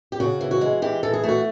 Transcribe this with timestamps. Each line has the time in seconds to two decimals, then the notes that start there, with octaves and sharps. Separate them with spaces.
0.12 G4
0.20 C#3 F#4
0.41 E3
0.51 F#4
0.61 G#3
0.82 E3 G4
1.03 E3 A4
1.13 G#4
1.24 A3
1.29 F#4